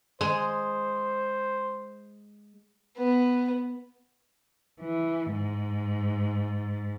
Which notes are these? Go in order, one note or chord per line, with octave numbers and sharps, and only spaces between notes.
G#3 C5
B3
E3
G#2